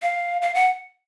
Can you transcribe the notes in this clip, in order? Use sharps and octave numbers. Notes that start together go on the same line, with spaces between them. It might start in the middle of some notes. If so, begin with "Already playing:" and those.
F5
F5
F#5